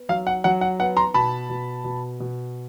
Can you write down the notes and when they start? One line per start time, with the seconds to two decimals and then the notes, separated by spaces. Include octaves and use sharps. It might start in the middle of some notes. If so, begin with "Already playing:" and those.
Already playing: B3
0.09 F#3 F5
0.27 F#5
0.44 F#3 F#5
0.61 F#5
0.80 B3 F#5
0.97 A#5 C6
1.14 B2 A5 B5
1.50 B2
1.84 B2
2.20 B2